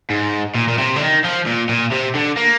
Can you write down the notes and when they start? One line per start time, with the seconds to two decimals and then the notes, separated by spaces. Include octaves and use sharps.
0.10 G#2
0.55 A#2
0.68 A#2
0.78 C3
0.96 D3
1.01 D#3
1.24 F3
1.46 A#2
1.69 A#2
1.91 C3
2.15 D3
2.37 A#3